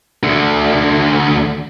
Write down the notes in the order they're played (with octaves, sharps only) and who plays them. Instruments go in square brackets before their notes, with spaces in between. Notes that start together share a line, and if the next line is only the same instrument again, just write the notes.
[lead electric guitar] D2 D3